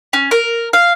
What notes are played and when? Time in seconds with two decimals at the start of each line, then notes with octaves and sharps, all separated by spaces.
0.13 C#4
0.31 A#4
0.73 F5